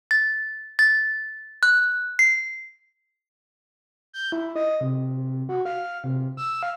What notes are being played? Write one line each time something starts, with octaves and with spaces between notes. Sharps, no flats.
A6
A6
F#6
C7
G6
E4
D#5
C3
F#4
F5
C3
E6
F5